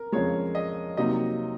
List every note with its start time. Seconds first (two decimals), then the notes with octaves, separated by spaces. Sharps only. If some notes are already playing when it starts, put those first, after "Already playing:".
Already playing: A#4
0.12 F2 C#3 F3 G#3 C#5
0.55 D#5
0.97 C3 F#3 A#3 D#4 D#5